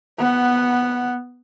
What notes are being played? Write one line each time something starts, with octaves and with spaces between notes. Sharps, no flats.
B3 F#5